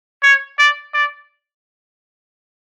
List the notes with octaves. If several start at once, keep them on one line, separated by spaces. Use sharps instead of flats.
C#5
D5
D5